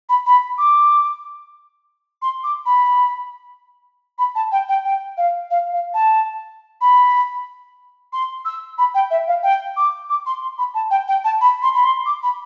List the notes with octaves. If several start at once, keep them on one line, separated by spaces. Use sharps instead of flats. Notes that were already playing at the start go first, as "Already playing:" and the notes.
B5
B5
D6
C6
D6
B5
B5
A5
G5
G5
G5
F5
F5
F5
A5
B5
C6
E6
B5
G5
E5
F5
G5
D6
D6
C6
C6
B5
A5
G5
G5
A5
B5
C6
B5
C6
D6
B5